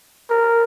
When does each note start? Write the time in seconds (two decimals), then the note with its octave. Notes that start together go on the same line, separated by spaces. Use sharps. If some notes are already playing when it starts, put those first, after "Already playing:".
0.30 A#4